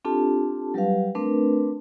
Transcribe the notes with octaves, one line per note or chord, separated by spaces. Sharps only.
C4 D4 F4 G4 A4 A5
F#3 G3 G4 B4 F5
A3 C4 D4 A#4 B4